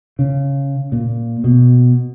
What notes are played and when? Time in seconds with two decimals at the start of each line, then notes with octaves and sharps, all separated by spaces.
0.19 C#3
0.92 A#2
1.44 B2